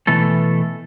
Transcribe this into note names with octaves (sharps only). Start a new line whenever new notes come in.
B2 E3 A3 A4